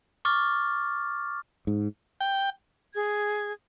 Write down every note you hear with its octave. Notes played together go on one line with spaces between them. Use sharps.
C#6 D6 F6 A6
G#2
G5
G#4 G#6